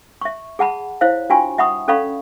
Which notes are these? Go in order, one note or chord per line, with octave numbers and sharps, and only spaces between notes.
E5 C#6
G#4 F#5 A5 B5
E4 C5 C#5 F5
D4 F4 F#4 G5 G#5 C#6
E5 F#5 B5 C#6 D#6
C#4 A4 D5 F5 B5 C#6